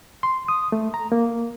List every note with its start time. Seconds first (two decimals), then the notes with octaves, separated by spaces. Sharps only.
0.23 C6
0.48 D#6
0.72 A3
0.94 A#5
1.12 A#3